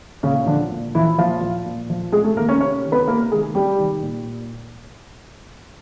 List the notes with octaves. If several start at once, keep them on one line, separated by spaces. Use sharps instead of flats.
A#2 C#3 C#4
D3 F3 D4
A#2
E3 F3 E4
A#2 F3 F4
F3
A#2
F3
C3 G#3 G#4
A3 A4
D#3 A#3 A#4
C#4 C#5
C3 C#4 C#5
D#3
B3 B4
C3 A#3 A#4
D#3 G#3 G#4
C3 G3 G4
D#3
A#2